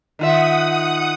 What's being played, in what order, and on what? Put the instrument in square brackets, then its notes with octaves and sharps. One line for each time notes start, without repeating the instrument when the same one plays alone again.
[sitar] D#3 F4 E5 [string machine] F#5 D#6